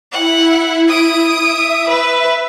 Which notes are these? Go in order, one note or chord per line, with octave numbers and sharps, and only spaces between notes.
E4 F#5
D#6 D7
E5
B4